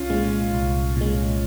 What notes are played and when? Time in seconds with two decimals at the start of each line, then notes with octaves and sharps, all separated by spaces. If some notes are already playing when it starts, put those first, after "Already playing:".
Already playing: C2 C#4 F4
0.10 A#2 G#3
0.53 C2
0.96 A#2 G#3